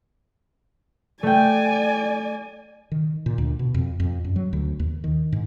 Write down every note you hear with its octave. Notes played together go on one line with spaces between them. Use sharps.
A3 D5 G5 G#5
D#3
A#2
D2
B2
F2
F2
F#2
F#3
D2
D#2
D#3
G#2